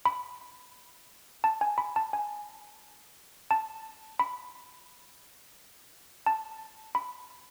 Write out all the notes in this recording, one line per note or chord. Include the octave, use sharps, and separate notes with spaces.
B5
A5
G#5
B5
A5
G#5
A5
B5
A5
B5